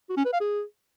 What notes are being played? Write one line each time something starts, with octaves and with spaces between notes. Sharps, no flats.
F#4
C#4
B4
F5
G#4